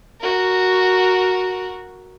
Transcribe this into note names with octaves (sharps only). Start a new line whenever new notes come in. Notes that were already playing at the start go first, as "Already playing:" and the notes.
F#4 A#4